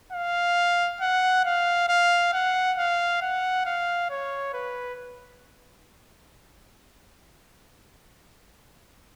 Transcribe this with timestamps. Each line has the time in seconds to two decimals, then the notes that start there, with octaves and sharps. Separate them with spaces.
0.13 F5
1.01 F#5
1.45 F5
1.89 F5
2.33 F#5
2.78 F5
3.22 F#5
3.66 F5
4.10 C#5
4.53 B4